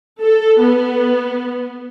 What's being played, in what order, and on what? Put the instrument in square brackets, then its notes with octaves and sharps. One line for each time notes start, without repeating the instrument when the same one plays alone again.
[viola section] A4
B3